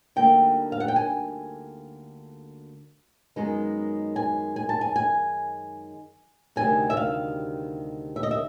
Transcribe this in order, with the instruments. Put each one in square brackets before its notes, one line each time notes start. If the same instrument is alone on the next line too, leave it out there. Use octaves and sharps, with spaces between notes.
[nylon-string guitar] D2 D3 G3 A#3 D#4 G5
F5
F#5
G5
G#5
F#2 D#3 G#3 B3 D#4
G#5
G#5
A5
G#5
G#5
D2 C3 D#3 G3 G#5
E5
F5
E5
D#5
E5